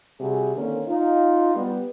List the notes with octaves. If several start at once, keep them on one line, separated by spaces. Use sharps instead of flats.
C3 G3 F#4 G#4
D3 D#3 A#3 C4 C#4
D#4 F4
G3 B3